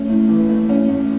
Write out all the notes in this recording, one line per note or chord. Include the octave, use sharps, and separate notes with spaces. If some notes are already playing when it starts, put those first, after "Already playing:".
Already playing: A3 C#4
A2
E3
A3
C#4
A2